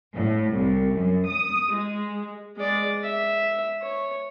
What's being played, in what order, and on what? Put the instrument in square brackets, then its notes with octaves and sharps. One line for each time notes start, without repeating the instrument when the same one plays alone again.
[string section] A2
C2
F#2
D#6
G#3
[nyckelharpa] G#3 D5
E5
C#5